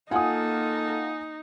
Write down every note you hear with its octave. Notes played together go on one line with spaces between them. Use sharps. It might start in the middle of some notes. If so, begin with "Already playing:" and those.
A#3 D#4 F4 A4 F#5 G#5 D#6